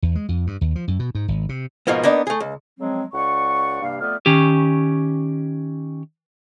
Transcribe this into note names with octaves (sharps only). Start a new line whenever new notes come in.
E2
G#3
F2
G2
D#2
F3
F#2
B2
G#2
G#1
C3
G#2 B2 F3 A#3 B3
A#3 B3 D4 D#4
A3 G#4
C#2
C#3 F3 F#3 G#3 C4
C#2 D5 F#5 C#6
G2 C3 A#3 F5
F2 A3 B3 D5 F6
D#3 C#4 G4